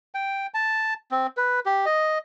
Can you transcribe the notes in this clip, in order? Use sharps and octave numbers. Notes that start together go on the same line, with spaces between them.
G5
A5
C4
B4
G4
D#5